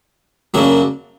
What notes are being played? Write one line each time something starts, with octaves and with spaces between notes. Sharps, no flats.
F#2 C#3 F#3 A#3 D4